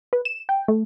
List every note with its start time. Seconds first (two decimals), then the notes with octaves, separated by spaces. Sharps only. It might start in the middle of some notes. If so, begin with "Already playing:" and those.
0.13 B4
0.25 E7
0.49 G5
0.68 A3